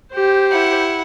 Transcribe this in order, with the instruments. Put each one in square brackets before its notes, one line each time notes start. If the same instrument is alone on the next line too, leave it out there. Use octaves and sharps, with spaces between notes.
[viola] G4 C5
[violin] E4 F#5